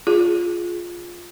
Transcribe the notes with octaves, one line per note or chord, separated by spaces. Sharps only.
F4 G#4